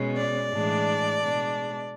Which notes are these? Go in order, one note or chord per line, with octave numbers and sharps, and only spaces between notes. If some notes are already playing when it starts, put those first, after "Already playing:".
Already playing: B2 G#3 C#4
D5
A2 E3 G#3 D4
B2 G#3 D4